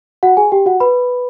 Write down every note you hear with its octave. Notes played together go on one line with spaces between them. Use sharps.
F#4 F#5
G#4 G#5
G4 G5
F#4 F#5
B4 B5